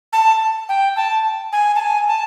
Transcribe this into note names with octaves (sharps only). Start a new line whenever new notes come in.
A5
G5
A5
G#5
A5
G#5
A5